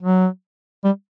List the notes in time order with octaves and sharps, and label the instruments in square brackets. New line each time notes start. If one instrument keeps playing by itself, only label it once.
[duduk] F#3
G3